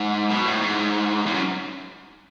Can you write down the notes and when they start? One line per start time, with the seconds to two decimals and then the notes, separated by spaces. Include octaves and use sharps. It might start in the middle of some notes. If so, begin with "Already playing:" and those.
Already playing: G#2
0.30 B2
0.46 A2
0.61 G#2
1.26 E2
1.34 F#2